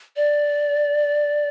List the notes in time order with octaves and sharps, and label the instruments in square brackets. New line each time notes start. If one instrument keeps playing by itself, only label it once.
[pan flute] D5